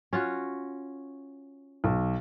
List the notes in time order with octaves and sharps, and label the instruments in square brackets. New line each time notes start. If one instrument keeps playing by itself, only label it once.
[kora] C#4 F4 F#4
[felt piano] B1